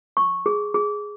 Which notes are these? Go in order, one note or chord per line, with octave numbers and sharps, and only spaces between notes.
C#6
G#4
G#4